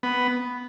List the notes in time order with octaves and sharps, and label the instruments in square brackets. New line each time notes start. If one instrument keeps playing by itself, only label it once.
[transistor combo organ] B3